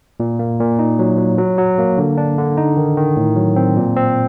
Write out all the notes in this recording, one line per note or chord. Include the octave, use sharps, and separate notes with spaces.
A#2
A#3
A#2
D#4
F#3
F#3
F#3
F#3
A#3
D3
D4
D3
D#4
D#3
D#3
A2
F#3
C4
A#2
C4